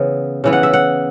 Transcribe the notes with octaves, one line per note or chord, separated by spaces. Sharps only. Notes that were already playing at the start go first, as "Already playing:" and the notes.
Already playing: C#3 E3 B3
C#3 E3 B3
F#5
E5
F#5